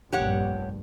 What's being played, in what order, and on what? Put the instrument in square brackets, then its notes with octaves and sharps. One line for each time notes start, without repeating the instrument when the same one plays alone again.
[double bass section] F1 A#1 G2 [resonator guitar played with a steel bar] G4 C#5 F#5